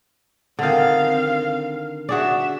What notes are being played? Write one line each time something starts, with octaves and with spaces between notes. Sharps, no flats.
D3 D#3 C4 F5
D4 F#4 G#4 D5 E5